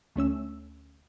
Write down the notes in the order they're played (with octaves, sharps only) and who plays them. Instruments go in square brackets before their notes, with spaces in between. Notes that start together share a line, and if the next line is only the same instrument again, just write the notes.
[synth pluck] D2 A3 C#4 E6